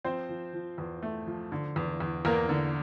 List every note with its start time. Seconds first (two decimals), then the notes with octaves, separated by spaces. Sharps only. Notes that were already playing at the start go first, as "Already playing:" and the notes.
0.04 F3 C4 C5
0.29 F3
0.54 F3
0.78 E2
1.02 A3
1.27 F3
1.52 D3
1.76 E2
2.00 E2
2.25 E2 A#3 A#4
2.49 D3